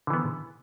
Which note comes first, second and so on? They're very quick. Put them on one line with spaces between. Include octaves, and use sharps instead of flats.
D3 E3 B3